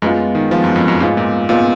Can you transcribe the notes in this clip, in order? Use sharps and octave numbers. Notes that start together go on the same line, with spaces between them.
F#2 G#3 B3 F4
D#3
F3 G#3 B3 F4
F#2
F2
F#2
G#2 G#3 B3 F4
A#2
A#2 G#3 B3 F4